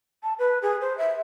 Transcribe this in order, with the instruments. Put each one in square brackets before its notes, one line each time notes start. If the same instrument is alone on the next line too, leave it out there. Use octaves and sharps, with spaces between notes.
[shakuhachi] A5
B4
G#4
C5
E5